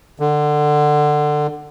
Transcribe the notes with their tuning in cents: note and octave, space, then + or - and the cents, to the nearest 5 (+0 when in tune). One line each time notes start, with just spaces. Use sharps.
D3 +20